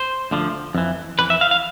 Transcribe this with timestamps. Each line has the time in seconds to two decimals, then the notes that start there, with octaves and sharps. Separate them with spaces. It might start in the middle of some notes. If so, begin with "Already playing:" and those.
Already playing: C5
0.31 D2 D3 F3
0.75 F2 E3
1.19 F2 E3 B4
1.30 E5
1.41 F5
1.51 F5